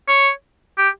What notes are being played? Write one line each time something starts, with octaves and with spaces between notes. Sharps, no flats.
C#5
G4